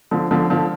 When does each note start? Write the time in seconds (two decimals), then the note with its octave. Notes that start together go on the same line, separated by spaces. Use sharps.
0.11 D3 F3
0.31 D3 F3
0.50 D3 F3